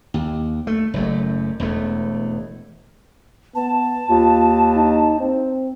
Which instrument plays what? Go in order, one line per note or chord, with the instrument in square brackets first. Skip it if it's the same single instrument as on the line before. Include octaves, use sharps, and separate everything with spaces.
[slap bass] D#2
A3
F#1 F#2 A3
E1 E2 A3
[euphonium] B3 [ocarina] A5
[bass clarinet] D#2 [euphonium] F4
[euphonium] D#4
C4